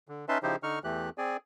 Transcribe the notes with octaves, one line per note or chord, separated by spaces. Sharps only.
D3
C#4 D#4 B4 E5 A5 C6
C#3 F3 D#4 E4 G4 C5
D3 D#4 C#6 F6
E2 E3 A3 G4 F#6
C4 G#4 D5 G#5